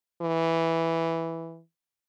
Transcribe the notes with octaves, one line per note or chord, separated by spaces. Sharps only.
E3